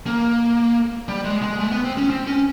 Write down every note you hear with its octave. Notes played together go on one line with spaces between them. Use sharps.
A#3
G3
G#3
G#3
A3
B3
C4
C#4
C4
C#4